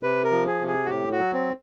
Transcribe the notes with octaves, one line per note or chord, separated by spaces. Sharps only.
C3 B4
A#4
F3
G#4
C3
G#4
F#4
A2 G4
F#4
F#3
C4